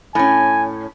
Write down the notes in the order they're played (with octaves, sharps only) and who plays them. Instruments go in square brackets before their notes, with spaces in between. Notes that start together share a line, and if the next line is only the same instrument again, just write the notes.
[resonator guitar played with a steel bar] A2 C#4 [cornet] G#5